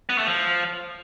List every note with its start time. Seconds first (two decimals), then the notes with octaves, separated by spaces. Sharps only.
0.09 B3
0.18 A3
0.27 F3